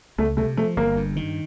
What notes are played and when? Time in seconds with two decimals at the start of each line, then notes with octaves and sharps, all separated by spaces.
0.18 C#2 A3
0.37 C3 A3
0.57 F3 A3
0.77 G1 A#3
0.96 G2
1.16 D#3